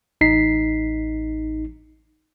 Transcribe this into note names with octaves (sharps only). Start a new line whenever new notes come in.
A1 D#4 B6 C7